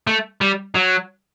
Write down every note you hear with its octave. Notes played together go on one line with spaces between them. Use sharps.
A3
G3
F#3